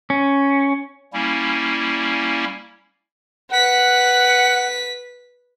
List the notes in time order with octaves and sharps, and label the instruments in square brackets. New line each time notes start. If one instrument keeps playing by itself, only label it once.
[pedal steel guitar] C#4
[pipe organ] G3 A#3 C#4 E4
[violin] B4 B6 [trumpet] F#5